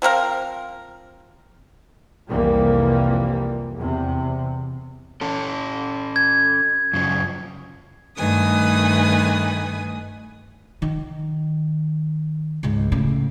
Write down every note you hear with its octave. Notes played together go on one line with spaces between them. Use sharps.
F3 C4 A#4 F5
C2 F2 E3 F3 G3 A#3
E2 C3
C#4 A4
G#6
F#2 C#3 F3
G2 D#3 A3 B4 G#5 D#6
D#3
C#2 G#2
A2 C#3